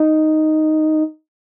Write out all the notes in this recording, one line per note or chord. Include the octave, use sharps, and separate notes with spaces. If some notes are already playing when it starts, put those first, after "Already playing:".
Already playing: D#4